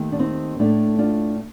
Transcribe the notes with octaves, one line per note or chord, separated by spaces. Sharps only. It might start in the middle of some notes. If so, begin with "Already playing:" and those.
Already playing: D#2 D#3 A3
D4
C4 D#4
A2 A3 D4
D4 F4